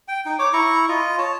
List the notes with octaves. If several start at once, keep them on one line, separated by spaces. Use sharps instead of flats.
G5
D#4 G5
C#5 D6
E4 A#5 C#6
F4 D#5
C#5 A5